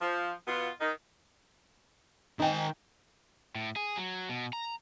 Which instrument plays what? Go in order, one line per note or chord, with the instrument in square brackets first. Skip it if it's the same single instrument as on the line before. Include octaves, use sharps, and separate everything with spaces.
[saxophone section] F3
B2 B3 F4
D#3 D#4
[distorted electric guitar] D#3 G#5 [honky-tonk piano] D#4 G5
[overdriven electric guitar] A2
G#4
F#3
B2
A#5